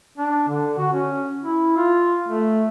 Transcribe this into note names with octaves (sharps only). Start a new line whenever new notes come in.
D4
D3
F#4
C#4
E4
F4
A3